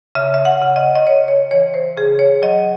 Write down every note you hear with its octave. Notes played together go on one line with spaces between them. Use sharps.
C#3 E5
E5
F#5
C#3
D#5
D#5
C#3 C#5
C#5
E3 C#5
C5
C#3 G#4
C#5
F#3 D#5